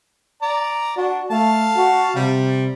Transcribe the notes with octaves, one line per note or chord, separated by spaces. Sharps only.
D5 A#5
D4 F#4
A3 F5 A5
F#4
C3 G3